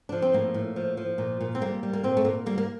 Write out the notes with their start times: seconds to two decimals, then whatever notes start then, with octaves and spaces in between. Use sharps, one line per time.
0.09 F3 D4
0.22 C4
0.33 A2 A#3
0.54 A2
0.76 F3
0.97 F3
1.18 A#2
1.41 A#2
1.55 C4
1.61 G3 A#3
1.83 G3
1.93 A#3
2.03 A#2 C4
2.17 A3
2.25 A#2 A#3
2.46 G3 A#3
2.58 A#3